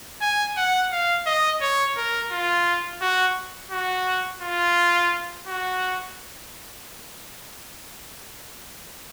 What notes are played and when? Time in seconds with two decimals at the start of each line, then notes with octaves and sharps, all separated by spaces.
0.21 G#5
0.57 F#5
0.92 F5
1.26 D#5
1.61 C#5
1.96 A#4
2.31 F4
3.01 F#4
3.71 F#4
4.42 F4
5.47 F#4